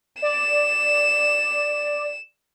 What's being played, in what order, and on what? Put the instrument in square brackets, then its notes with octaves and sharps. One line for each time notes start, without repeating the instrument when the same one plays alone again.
[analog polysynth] D5 [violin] E7